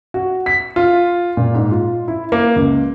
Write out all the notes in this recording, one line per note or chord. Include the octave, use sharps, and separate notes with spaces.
F#4
B6
F4
A#2
G#2
F4
E4
A#3
C#2